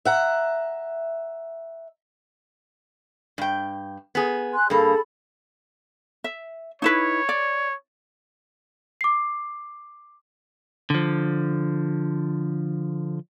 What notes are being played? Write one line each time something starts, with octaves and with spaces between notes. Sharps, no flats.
E5 F#5 A#5
G2 G5
B3 G#4
G#5 C6 F#6
G2 A#3 G#4 A4 B5
E5
D#4 E4 B4 C#5
D5
D6 C7
D3 F3